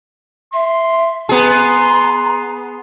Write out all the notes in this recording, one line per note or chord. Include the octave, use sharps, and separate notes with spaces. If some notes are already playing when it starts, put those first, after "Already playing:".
E5 C6
B3 G#4 A#5 C6